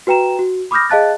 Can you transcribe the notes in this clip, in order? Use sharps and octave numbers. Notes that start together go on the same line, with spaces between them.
F#4 B4 G5 A#5 E7
F#4
B5 D6 D#6 F6 G6 A#6
G#4 D#5 F5 A5 F#6 A6